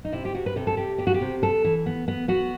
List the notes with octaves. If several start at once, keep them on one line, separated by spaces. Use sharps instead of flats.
D#4
C3 E4
G4
C3 F#4
B4
C3 A4
A4
C3 G4
B3 G4
F#4
G4
C3
B3 A4
E3
B3
B3
B3 F#4